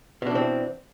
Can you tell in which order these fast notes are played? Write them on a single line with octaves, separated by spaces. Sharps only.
B2 D4 E3 C4